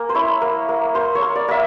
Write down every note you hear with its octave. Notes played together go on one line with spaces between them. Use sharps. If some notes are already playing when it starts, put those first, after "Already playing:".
Already playing: A#3 G#5
C5
E4 C#5
A#3
A#3
A#3 C5
C#5
A#3
D5
A#3 E5